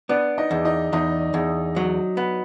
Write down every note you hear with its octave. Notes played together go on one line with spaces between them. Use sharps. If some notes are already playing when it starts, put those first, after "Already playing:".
B3 D4 D5
D#4 D#5
E2
D#4 D#5
E2 D#4 D#5
E2
F#3
B3